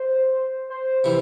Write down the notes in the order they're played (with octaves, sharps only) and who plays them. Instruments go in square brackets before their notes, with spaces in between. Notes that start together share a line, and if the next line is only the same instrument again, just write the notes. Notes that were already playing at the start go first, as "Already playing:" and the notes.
Already playing: [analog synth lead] C5
C5
[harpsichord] C3 E3